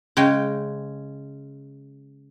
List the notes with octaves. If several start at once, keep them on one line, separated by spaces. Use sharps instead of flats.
C#3 G#3 C#5 G5